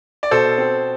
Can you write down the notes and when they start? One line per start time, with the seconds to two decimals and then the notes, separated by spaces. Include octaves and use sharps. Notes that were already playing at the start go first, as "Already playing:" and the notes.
0.23 D5
0.31 B2 A4 C5
0.58 C4